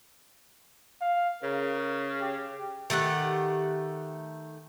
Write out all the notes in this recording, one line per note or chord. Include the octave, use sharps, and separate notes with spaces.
F5
C#3 A#4
G4
D#3 A3 G4 F#5